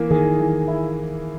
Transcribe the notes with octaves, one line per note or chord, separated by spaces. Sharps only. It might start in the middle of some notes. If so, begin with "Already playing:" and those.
Already playing: E3 A#3
D#3 G#4
E3
E4